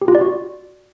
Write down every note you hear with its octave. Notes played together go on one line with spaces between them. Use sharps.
G4
F4
D5
F#4